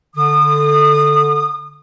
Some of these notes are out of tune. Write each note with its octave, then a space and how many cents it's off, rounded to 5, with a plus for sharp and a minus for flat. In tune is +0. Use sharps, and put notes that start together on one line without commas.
D3 +0 D#6 -35